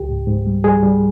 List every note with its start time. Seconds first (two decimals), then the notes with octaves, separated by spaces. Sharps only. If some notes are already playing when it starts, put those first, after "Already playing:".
Already playing: C#2 G4
0.09 G#2
0.27 G#2
0.47 G3
0.64 G3 G#4
0.83 G3